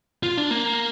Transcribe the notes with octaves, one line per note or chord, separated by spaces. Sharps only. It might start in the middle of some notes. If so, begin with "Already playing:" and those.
F4
D4
A#3